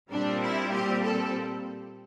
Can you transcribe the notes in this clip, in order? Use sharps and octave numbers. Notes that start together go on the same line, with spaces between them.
A#2 G3 C4 D4
E4
G4
A4